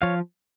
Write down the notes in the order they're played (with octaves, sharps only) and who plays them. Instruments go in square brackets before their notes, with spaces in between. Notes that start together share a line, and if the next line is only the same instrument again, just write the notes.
[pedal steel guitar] F3 C#5 F5